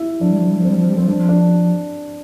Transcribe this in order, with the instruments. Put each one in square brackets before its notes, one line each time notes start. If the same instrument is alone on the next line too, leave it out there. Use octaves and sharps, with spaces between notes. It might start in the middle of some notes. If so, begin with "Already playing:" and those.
Already playing: [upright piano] E4
[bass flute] F3 [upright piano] D4
[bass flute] G3
F3
G3
F3
[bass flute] G3 [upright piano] C4
[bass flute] F3
G3
[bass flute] F3 [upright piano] C4
[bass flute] G3 [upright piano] D4
[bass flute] F3
[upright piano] D4